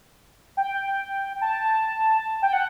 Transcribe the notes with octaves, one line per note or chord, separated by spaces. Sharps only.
G5
A5
G5
F#5